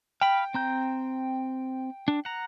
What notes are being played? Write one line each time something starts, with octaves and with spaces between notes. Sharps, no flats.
F5 G5 B5
C4 A#5 G6
D4
F#5 A#5